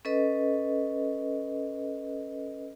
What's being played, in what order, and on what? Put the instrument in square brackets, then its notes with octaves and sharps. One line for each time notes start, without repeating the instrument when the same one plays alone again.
[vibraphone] C#4 A4 B4 D#5